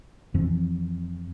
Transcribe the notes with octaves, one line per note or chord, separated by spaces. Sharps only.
F2 E3 F3 C4